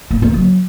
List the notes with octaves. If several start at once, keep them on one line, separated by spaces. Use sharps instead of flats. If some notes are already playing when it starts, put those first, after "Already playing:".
A#3
A2
A#3
D3
F#3